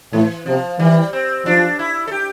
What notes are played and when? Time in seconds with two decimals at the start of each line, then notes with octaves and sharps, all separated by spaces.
0.13 A2 E3
0.46 C3 F3
0.79 E3 G3
1.13 C4
1.45 F3 D4
1.79 E4
2.07 A4
2.11 G4